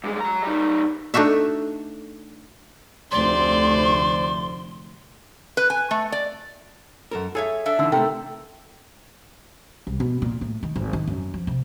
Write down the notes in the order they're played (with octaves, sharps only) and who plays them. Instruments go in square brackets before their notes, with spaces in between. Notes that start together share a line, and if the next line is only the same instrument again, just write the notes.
[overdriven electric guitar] G2 G#3
F#3 A#5
G3 D#4
[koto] A3 D4 D#4 F#4 E5
[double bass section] F1 D2 A3 [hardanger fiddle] C5 D5 [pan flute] C6
[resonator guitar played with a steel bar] B4
G#5
A3
D5
[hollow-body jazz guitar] F#2 A4 A#4
[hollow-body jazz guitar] G#4 [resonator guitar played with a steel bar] A4 C#5 E5
[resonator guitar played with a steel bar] D4 A4 E5
[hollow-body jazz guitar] D3 E3 [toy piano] D#4 E6
[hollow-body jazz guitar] C3 A3 [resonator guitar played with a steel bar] A4 A#4 [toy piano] G5
[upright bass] C2
B2
A#2
A2
D#3
G#1
D#3
F#2
F3
C3